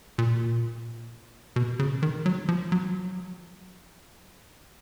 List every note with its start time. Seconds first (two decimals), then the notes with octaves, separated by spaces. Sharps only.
0.18 A#2
1.56 B2
1.79 C#3
2.03 D#3
2.26 F#3
2.49 F3
2.72 F#3